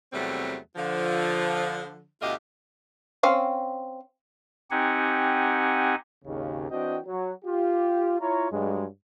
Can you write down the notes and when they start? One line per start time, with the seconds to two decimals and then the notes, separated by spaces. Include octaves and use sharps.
0.13 E2 C3 F#3 G3 A3 C4
0.76 D3 F3
2.21 D2 B2 A3 F4 G4 D#5
3.23 C4 C#4 F5
4.71 C4 D#4 G4 F#5 G#5
6.25 G#1 D#2 C#3
6.70 E3 C4 D4 F#4 D#5 G5
7.06 F#3
7.45 F4 G4
8.20 E4 F4 C#5 A#5
8.51 G2 F#3 G#3